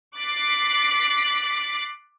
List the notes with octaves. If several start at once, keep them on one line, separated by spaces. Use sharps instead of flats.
D6 F#6 A6 B6 C7